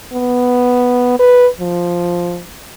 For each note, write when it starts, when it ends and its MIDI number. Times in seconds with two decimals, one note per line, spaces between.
0.13 1.17 59
1.19 1.48 71
1.61 2.41 53